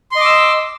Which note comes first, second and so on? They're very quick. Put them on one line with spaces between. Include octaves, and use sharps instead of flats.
C6 D#5 D6 E6